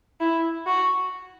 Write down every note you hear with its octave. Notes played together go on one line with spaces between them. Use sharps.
E4
F#4